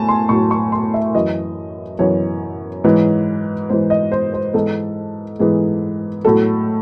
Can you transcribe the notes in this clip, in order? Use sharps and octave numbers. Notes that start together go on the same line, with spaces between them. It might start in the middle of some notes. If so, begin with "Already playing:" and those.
Already playing: A2 G#5 A5
C6
A2 F#3 C#6
C#6
C6
E5
F#2 E3 D#5
F#2 E3 C#5
G#2 E3
G#2 E3 C5
D#5
C5
C5
G#2 E3 A4
G#2 E3 G#4
A2 F#3 A4